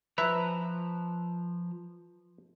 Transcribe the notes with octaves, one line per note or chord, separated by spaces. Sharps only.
F3 B4 E5 A#5 F#6